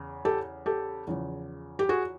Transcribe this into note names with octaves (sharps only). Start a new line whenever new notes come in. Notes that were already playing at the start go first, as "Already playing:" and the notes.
Already playing: E2 C#3
G4 A4
G4 A4
E2 C#3 F3
G4
F#4 G#4